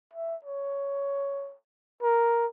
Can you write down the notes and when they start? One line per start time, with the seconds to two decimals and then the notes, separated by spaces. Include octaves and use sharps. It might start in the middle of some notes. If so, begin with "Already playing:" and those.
0.13 E5
0.45 C#5
2.02 A#4